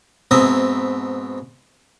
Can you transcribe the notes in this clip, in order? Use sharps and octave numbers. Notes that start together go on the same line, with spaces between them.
G#2 B2 C4 E5 A#5 D#6